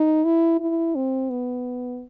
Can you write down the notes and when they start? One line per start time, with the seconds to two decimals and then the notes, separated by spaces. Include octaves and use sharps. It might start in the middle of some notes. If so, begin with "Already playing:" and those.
Already playing: D#4
0.25 E4
0.60 E4
0.96 C4
1.30 B3